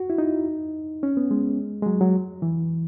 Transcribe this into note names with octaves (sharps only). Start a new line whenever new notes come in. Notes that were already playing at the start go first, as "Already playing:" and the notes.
Already playing: F#4
E4
D#4
C#4
B3
G#3
G#3
F#3
F#3
E3